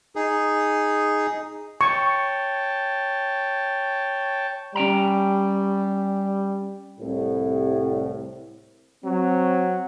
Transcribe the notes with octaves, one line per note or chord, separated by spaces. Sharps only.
D#4 G#4
C#5 G5 A5 C#6
G3 C#4 G5 A#5
C2 A2
F#3 C4